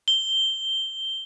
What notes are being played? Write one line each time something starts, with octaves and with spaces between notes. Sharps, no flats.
G7